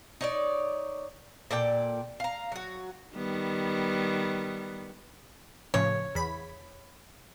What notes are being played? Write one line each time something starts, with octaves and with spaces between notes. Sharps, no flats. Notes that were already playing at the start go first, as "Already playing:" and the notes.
D#4 C#5 D5
A#2 A4 D5 G5
F5 A#5
F#3 F#4
D#3 G3 B3
A2 C#3 F3 C#5
E2 B5